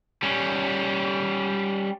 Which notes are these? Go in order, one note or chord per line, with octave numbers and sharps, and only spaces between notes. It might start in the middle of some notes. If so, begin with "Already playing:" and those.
G3 C#4